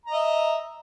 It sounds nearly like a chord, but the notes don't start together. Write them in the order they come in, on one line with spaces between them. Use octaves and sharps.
A#5 D#5 E5